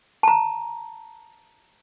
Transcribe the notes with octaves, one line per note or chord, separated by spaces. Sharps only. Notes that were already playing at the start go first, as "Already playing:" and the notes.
A5 A#5